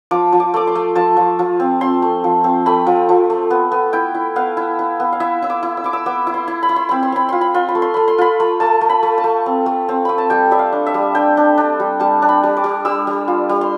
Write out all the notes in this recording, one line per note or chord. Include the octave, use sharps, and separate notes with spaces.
F3 D6
F3
D6
A3 D6
C6
A3
F3 A5
F3
F3
C4
C4 C6
A3
F3
C4
A3 B5
F3
F3
A3
B3
B3
E4 G5
E4
B3 F5
E4
E4
B3
F5
E4 E5
E4 E6
D6
E4
E6
E4 D6
E6
B3 D6
E4
C6
E4
B5
E4
C6
C4 B5
C6
C4 B5
F4 C6
B5
F4 C6
B5
A3
C6
A3 B5
C6
F4 B5
A3
A3 A5
A3
B5
A3
A5
A3
C4
A3
C4
A3 B5
A5
G3 G5
G3 E5
F5
D4
E5
G3
D4 G5
D4
D4
G3
G3 A5
D4
B5
G3
D6
G3
G3 E6
G3
F4
G3
C6